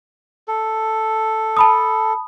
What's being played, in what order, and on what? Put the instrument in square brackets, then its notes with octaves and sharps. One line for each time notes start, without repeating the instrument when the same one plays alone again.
[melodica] A4
[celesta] A5 B5 D#6